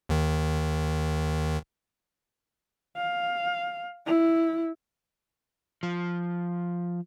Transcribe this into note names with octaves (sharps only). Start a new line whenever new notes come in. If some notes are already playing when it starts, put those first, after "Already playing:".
D#2 D#3
F5
E4
F3